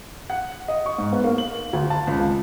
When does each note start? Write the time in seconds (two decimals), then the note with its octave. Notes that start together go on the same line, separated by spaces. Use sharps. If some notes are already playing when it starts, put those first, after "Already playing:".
0.30 F#5
0.68 D#5
0.86 C#6
0.98 G#2
1.12 B3
1.24 A#3
1.38 F#7
1.73 D2
1.90 A5
2.07 C#2